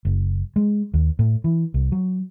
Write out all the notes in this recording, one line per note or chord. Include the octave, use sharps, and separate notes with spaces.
F#1
G#3
D#2
A2
E3
C2
F#3